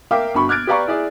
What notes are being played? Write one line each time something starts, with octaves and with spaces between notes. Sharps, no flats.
A#4 E5 F5 G5 D6
G1 D4 F#4 B5 C#6
D6 F6 F#6 G#6 A6 D7
G4 B4 D5 F5 A#5 C#6
E4 G#4 D5